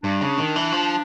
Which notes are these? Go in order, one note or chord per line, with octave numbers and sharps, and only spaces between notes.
G2 D4
C#3
D#3
E3
F3